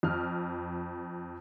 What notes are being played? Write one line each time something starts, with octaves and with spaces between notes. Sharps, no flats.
F2 F6